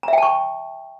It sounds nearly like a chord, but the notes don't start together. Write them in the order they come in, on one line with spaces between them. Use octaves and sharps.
A#5 E5 G5 A5 C#6